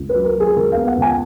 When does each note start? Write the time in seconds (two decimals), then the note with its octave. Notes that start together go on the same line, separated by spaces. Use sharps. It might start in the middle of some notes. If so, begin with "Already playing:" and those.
Already playing: C#2
0.09 B4
0.15 F#3
0.25 A#4
0.36 F#3 G#4
0.56 C#2 A#4
0.72 B3 F5
0.87 F#5
0.97 C#2 G#5